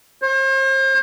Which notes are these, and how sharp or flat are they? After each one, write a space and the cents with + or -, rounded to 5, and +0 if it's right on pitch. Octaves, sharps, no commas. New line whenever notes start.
C5 +40